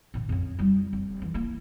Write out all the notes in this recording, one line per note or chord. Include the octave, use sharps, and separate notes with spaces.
A2 D3
F2 C#4
G3 E4
F1
E3
A#3 E4